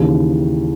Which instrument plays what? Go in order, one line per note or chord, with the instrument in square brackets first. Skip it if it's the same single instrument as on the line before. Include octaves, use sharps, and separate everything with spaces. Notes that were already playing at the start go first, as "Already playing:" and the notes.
Already playing: [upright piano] D#2 C#3 E3